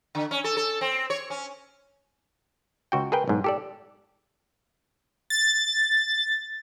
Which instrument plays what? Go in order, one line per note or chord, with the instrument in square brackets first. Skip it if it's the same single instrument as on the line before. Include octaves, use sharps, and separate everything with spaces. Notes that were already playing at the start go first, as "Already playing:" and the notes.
[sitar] D3
C#4
A4
A4
C4
C#5
C#4
[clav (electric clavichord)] C#2 F#4 G5
G#4 A#4 B4 G5
B1 G#2
G4 A4 D5
[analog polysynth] A6